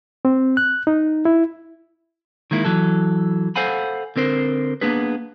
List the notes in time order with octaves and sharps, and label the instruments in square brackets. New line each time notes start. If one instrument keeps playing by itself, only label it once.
[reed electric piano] C4
F#6
D#4
E4
[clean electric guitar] D#3 G#3 A#3 E4
E3 F#3 A4
A4 C5 F5 F#5 G#5 B5
D3 C4 A#4 C5
A#3 B3 D4 G#4 B4